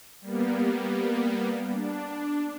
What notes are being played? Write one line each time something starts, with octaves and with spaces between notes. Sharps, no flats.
G3 A#3 B3
D4